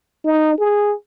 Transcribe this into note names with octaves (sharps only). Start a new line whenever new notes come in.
D#4
G#4